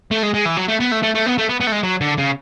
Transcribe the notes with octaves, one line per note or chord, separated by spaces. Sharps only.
A3
G#3
G#3
E3
F#3
A3
B3
A3
A3
A3
B3
A3
B3
B3
A3
G#3
F#3
D3
C#3